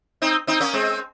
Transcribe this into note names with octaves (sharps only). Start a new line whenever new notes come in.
C4 D#4
C4 D#4
A#3 C#4
G#3 C4